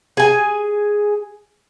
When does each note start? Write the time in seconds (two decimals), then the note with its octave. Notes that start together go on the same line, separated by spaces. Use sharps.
0.17 G#4 G#5